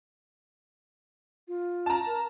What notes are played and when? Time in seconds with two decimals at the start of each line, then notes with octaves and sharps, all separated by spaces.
1.48 F4
1.86 A5 A#5
2.06 A#4